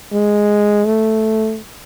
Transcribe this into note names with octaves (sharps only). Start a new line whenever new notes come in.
G#3
A3